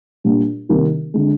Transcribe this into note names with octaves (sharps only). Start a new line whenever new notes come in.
A#2 G3 D4
C3 D#3 G3 A#3
D3 G#3